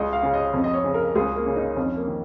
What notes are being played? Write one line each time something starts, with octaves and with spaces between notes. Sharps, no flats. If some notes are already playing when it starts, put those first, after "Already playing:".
Already playing: C#2 D#5
F5
C#3
D#5
F2
D#5
C#5
C#3
A#4
C#2 G#4
A#3
C#3
D#4
F2 C#4
A#3
D#3